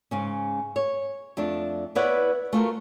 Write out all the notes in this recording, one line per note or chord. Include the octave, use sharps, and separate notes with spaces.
G#2 C#3 C#4
C#5
F2 A3 D4
B3 E4 B4 C#5 D5 F#5
A3 F4 F#4 A#4